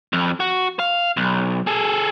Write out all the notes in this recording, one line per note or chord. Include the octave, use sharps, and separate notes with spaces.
F2
F#4
F5
B1
G#4 A4